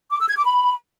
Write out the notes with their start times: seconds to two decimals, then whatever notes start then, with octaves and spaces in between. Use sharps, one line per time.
0.12 D6
0.20 E6
0.28 G#6
0.36 D6
0.45 B5